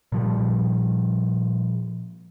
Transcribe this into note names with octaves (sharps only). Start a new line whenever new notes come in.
A#2 F3 G3